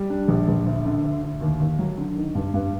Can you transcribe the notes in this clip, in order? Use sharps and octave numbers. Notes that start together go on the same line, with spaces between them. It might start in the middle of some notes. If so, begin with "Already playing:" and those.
Already playing: G3
D4
A#1
A#1
D2
D3
D2
D2
D#2
D#2
F#3
D3
D#3
G2
G2